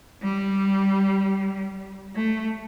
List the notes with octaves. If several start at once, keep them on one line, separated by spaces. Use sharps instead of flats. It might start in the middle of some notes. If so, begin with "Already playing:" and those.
G3
A3